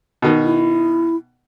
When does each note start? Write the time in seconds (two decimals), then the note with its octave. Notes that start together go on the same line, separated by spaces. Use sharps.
0.22 B2 D#3
0.44 E4